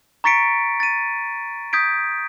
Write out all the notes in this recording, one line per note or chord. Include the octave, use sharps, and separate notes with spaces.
A#5 C#6 A6 B6 C#7 D7
A6 D#7
D#6 G6 G#6 B6 D7